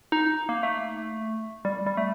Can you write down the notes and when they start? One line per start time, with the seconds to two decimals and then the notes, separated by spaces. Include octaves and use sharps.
0.12 D#4
0.49 A#3
0.63 A3
1.65 G3
1.86 G3
1.97 A3